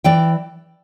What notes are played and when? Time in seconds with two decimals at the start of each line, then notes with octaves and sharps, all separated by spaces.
0.04 E3 D5 G5